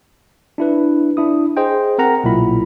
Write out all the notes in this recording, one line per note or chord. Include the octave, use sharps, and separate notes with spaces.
D4 E4 B4
D4 E4 D#6
G#4 C5 D#5 G5
C4 A#4 F#5 A#5
B1 A#2 E4 B5